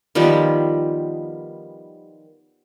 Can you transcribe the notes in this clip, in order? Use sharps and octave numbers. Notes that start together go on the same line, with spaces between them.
D#3 F3 G3 B3